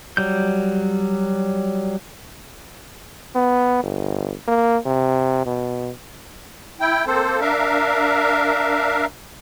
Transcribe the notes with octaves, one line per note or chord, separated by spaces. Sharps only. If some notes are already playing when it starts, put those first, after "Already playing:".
F#3 G3 G6
B3
G1
A#3
C3
B2
E4 G5
A#3 C4 A4 C5
D4 A#4 E5 F5